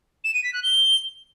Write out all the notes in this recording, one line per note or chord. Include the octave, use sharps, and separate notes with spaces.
E7
D#7
B6
F#6
G7